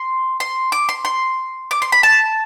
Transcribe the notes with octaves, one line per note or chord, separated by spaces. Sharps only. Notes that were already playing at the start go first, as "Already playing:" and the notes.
Already playing: C6
C6
D6
C6
C6
D6
C6
B5
A5